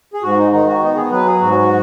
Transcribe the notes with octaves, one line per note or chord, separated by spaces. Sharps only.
G#4
G#2 F#4
D#4
D#3 D#4
F#4
B3 D#4
G#4
F#3 B4
G#4
G#2 F#4